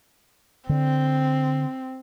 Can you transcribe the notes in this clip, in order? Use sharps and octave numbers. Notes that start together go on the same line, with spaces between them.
D3 C4